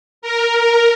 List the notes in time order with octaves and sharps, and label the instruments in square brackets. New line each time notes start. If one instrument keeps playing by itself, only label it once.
[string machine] A#4